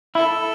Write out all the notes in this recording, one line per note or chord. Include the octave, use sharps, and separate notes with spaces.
E4 A4